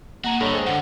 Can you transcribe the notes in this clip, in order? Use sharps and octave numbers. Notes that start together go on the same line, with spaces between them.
A#3 F#4 G#4 F#5 A#5
G2 D3 A4 C#5 D#5
G#3 G#4 C5 G5
F#2 D3 F#5